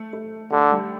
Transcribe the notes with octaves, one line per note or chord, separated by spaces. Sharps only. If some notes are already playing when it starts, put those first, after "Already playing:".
Already playing: A3
A3
D3 A3
G3